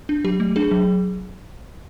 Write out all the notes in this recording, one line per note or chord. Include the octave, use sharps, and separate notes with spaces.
D4
F#3 G4
A3
D4 G#4
F#3